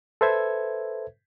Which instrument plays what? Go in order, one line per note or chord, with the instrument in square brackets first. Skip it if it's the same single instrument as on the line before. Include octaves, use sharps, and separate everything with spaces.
[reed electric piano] A4 B4 C5 E5 G#6